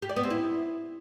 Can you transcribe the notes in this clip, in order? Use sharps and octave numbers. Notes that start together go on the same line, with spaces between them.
G4
D5
B3
C4
E4